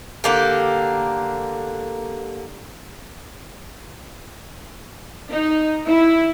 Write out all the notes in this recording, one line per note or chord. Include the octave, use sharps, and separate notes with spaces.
D3 A#3 G4
D#4
E4